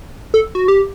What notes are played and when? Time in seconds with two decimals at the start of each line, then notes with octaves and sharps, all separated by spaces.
0.34 A4
0.55 F#4
0.68 G4